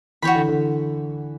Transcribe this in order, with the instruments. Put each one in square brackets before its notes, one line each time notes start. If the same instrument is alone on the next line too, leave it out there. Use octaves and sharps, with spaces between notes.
[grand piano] E3 [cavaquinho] F#4 C#5 G5 B5
[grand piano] D3
D3